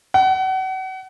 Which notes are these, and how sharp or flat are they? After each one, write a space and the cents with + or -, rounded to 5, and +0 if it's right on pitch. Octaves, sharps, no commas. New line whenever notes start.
F#5 +35